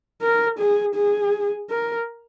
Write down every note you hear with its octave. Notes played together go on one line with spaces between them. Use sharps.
A#4
G#4
G#4
A#4